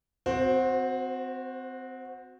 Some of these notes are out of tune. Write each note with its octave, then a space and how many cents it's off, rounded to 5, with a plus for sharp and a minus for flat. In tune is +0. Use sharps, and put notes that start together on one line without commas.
C4 -25 F#4 -15 C5 +10